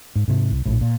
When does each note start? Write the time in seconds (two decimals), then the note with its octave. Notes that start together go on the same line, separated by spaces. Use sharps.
0.16 G#2
0.28 G#2 C3
0.51 C2
0.66 A#1 A2
0.81 A#2